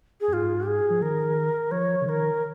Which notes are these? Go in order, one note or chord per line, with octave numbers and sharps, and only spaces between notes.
G#4
F2
G#2 F4
G#4
F3
D#3 A#4
F3 C#5
C#3
D#3 A#4 C#5